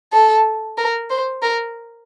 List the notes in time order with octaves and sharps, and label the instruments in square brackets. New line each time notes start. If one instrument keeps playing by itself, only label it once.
[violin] A4
A#4
C5
A#4